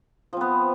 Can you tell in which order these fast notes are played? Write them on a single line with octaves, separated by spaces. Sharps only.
F3 C4 B3